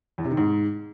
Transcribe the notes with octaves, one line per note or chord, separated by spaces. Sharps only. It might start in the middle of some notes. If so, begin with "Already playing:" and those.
E2
C3
D#3
G#2